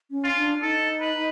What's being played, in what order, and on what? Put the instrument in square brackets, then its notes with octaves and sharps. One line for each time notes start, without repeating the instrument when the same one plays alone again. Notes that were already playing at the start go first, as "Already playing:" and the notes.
[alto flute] C#4
[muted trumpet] F4
[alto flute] D4
[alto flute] D#4 [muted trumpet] A4
[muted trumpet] B4